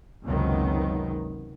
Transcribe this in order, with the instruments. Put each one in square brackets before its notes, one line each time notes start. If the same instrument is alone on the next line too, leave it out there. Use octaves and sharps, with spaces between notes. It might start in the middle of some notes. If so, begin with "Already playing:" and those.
[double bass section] F#1 C#2 C3 D#3 F#3 B3